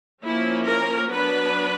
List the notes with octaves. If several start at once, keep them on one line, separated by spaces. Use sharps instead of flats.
F3 A#3 C#4 E4
A#4
F#3 B3 D4 B4